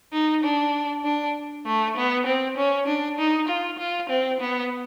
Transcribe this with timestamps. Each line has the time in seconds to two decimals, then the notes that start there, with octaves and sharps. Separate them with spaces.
0.13 D#4
0.44 D4
1.04 D4
1.66 A3
1.96 B3
2.26 C4
2.57 C#4
2.87 D4
3.18 D#4
3.48 F4
3.78 F4
4.09 C4
4.40 B3